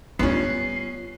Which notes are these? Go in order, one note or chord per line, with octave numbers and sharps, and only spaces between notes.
G3 B3 C#4 F4 C7